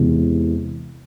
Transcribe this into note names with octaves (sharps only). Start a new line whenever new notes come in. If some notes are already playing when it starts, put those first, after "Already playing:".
Already playing: E2 C3 E3 G#3